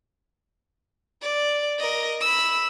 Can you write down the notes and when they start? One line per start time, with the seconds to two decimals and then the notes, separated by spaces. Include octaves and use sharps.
1.22 D5
1.79 A#4 D#5
2.21 B5 E6